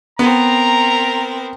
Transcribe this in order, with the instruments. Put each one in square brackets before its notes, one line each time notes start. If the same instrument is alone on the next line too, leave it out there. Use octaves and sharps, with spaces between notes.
[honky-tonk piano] B3 [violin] C4 A#4 [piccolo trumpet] A#5